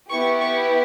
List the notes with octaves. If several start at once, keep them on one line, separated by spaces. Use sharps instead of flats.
B3 E4 G4 C#6
C#6